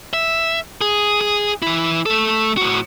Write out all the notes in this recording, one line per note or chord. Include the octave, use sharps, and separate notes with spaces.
E5
G#4
G#4
E3 E4
A3 A4
A2 F#4